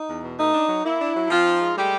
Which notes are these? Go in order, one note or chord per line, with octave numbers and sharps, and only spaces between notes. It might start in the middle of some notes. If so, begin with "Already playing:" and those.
Already playing: D#4
E2
B2
A3 D#4
D4
F#3
A#3 E4
D4
F#3
F3 C4 F4
D#4
G#3
G3 A3 G4